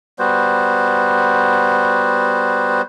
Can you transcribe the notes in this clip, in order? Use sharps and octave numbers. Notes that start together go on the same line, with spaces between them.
G3 B3 F#4 C5